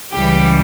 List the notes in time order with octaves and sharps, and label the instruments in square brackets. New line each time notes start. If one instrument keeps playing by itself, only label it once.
[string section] C#2 C#3 E3 G3 G4